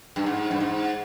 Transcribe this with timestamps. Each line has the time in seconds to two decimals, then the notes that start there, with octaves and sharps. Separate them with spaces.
0.16 G2
0.26 G#2
0.51 G2
0.60 G#2